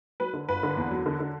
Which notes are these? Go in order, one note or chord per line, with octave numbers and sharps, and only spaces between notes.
F#3 B4
D3
G1 B4
D3
E2
F#3
D3
D3